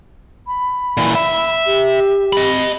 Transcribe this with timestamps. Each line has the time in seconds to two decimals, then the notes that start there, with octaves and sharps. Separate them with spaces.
0.47 B5
0.97 A#2 E3
1.15 E5
1.66 G4
2.33 D#5 B5